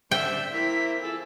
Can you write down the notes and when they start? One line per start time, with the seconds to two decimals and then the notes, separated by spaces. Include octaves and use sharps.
0.11 D4 C5 E5 G5
0.53 A#3 C4 E4 B6
1.02 F3 G#4 A4 E6